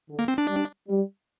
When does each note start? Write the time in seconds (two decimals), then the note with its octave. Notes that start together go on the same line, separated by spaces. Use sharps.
0.09 D3
0.19 A#3
0.28 C4
0.38 D4
0.48 G3
0.88 G3